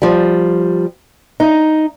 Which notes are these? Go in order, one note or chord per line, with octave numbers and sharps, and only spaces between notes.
F3 G3
D#4